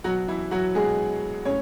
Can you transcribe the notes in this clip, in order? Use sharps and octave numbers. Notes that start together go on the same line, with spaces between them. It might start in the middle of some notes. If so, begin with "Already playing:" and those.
B2 F#3 F#4
E3 E4
F#3 F#4
B2 G#3 G#4
A2 C#4 C#5